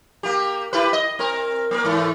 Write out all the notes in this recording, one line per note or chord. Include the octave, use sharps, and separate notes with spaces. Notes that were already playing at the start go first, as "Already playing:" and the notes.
A#3 G4
E4 G4 B4
D#5
C4 A#4
A#3 A#4
G#2 E3 A3